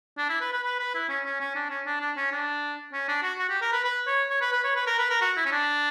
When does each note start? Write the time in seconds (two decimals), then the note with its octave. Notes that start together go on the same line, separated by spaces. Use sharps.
0.18 D4
0.30 E4
0.41 B4
0.52 B4
0.64 B4
0.79 B4
0.95 E4
1.09 C#4
1.25 C#4
1.40 C#4
1.55 D4
1.70 C#4
1.86 D4
2.01 D4
2.16 C#4
2.32 D4
2.93 C#4
3.08 D4
3.23 F#4
3.38 F#4
3.49 G4
3.61 A#4
3.73 B4
3.84 B4
4.07 C#5
4.30 C#5
4.41 B4
4.52 B4
4.64 C#5
4.76 B4
4.87 A#4
4.99 B4
5.10 A#4
5.21 F#4
5.37 E4
5.46 C#4
5.52 D4